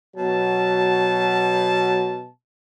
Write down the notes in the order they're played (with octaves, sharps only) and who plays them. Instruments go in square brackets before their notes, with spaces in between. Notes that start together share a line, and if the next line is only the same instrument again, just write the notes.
[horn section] B2 A5 [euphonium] F#3